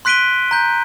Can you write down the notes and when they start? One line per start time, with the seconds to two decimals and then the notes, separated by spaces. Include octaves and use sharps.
0.05 C6 F#6 B6 D7 D#7 G7
0.51 A#5 G6